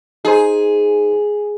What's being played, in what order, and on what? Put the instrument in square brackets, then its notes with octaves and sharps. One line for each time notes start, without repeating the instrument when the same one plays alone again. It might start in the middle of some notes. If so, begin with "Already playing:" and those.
[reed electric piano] D#4 C5 [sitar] G#4